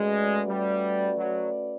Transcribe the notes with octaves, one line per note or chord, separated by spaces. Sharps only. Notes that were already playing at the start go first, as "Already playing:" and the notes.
Already playing: G#3 A3 C#4 F#4 B4 D5
G3
F#3